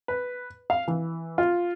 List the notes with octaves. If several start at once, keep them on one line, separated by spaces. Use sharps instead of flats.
B4
F5
E3
F4